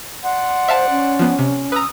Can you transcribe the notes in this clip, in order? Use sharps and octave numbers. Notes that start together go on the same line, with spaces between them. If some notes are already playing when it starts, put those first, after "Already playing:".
D5 F#5 C6
C5 E5 F5 A5
C#4
F3 B3
C3
B4 A#5 D#6 E6